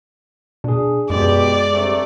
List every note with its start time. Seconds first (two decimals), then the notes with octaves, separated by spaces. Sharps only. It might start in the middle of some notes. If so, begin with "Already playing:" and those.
0.64 B2 D4 G#4
1.10 F#2 B2 G#3 G4 D5
1.71 G2 C3 A3